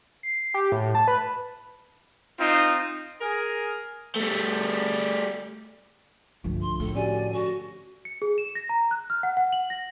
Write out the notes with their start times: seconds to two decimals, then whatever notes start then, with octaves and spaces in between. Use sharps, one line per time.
0.23 C7
0.54 G4
0.72 A2
0.95 A5
1.08 B4
2.39 C4 D#4 F4
3.20 G#4 A#4
4.15 G3 A3
6.44 C2 G2 D3 F3 A3
6.62 F3 C6
6.80 A2 A4
6.96 C#4 F#4 G4 D5 G#5
7.15 A4
7.33 F#4
8.05 C#7
8.22 G#4
8.38 E7
8.55 A#6
8.69 A#5
8.91 F#6
9.10 F6
9.23 F#5
9.37 F#5
9.53 F#7
9.70 A#6